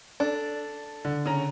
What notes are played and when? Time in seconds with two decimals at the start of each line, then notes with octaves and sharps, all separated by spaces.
0.20 D4 A4
1.05 D3
1.25 C#3 C#4 A#5